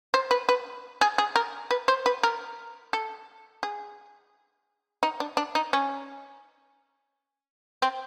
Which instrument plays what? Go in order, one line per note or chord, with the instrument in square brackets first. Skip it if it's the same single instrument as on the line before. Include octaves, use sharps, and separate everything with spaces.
[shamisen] C5
B4
B4
G#4
G#4
A#4
B4
C5
B4
A#4
A4
G#4
D#4
D4
D4
D#4
C#4
C4